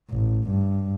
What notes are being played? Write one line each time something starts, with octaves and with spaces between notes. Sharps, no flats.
A1
G2